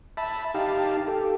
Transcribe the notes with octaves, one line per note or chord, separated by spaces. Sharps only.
E5 A5 B5
D#4 G4 F5 A5
G4 A4